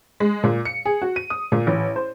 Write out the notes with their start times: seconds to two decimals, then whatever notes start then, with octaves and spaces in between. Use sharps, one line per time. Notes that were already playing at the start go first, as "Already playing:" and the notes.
0.20 G#3
0.44 A#2
0.65 C#7
0.86 G#4
1.02 F#4
1.16 D#7
1.30 D#6
1.52 A#2
1.67 A1
1.96 C5